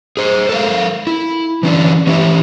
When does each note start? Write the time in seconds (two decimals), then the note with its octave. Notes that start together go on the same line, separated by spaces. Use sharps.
0.17 G#4 C5
0.49 A4 A#4 F5
1.07 E4
1.63 E3 C#4 D4
2.07 E3 C#4 E4 G4 E5